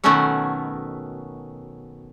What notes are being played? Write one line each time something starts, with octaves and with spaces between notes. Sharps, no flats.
B2 D#3 F#3 A3 C#4 F#5